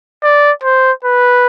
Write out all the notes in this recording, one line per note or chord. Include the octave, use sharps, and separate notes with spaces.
D5
C5
B4